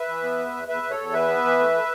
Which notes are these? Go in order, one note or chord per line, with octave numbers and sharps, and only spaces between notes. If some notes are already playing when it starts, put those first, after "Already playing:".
Already playing: B4 E5
E3
B3
E2
E2
E2 B4 E5
E2
A4 C#5
E2
E3 B4 E5
B3
E3
A3
A3